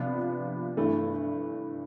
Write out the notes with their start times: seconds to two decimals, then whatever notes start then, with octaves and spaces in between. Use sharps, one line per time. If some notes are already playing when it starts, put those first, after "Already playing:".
Already playing: C3 F3 B3 D4
0.77 G2 E3 A3